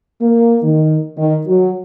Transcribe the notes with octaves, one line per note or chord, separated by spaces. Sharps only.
A#3
D#3
D#3
F#3